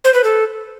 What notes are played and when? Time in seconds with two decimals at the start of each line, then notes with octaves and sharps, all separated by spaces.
0.04 C5
0.14 B4
0.24 A4